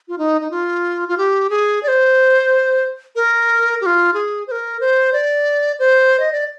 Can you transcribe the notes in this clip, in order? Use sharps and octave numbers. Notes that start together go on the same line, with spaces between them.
F4
D#4
D#4
F4
F4
G4
G#4
D5
C5
A#4
G4
F4
G#4
C5
A#4
C5
D5
C5
D#5
D5